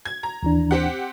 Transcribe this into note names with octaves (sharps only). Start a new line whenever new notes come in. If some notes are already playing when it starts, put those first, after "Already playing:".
G#6
A#5
D#2 E3 D4
C4 G4 F#5